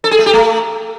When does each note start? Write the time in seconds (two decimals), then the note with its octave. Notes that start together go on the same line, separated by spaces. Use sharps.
0.04 A4
0.11 G#4
0.19 A3
0.26 G4
0.33 A3